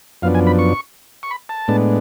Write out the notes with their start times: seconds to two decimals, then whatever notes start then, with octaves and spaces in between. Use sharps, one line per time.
0.22 F#2 F3 B3 D4 F5
0.35 G#5
0.47 B5
0.59 C#6
1.23 C#6
1.31 B5
1.49 A5
1.68 A2 G#3 B3 D4